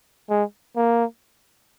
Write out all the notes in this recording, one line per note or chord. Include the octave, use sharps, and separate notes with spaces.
G#3
A#3